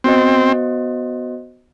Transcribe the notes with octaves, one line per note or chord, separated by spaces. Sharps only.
B3 C4 F#4 C5 D#5